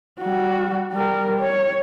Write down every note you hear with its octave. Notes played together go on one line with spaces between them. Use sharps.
G3 F#4
G3 A#4
C#5